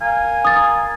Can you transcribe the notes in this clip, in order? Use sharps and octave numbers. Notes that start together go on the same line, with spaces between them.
A#4 F5 G#5
D#6 A6